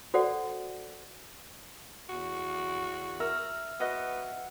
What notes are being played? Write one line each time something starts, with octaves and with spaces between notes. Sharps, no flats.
F#4 A4 C5 D5 F#5
E2 F#4
A#4 E5 E6 F6
B3 F#4 B4 D#5 F#5